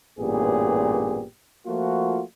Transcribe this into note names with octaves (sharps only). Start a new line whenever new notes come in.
A1 G2 A#2 B3 G4 G#4
F3 A3 A#3 F4 F#4